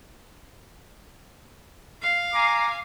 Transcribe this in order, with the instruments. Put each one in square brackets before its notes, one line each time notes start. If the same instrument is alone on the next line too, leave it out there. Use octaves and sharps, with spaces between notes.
[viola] F5
[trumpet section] G#5 A#5 D6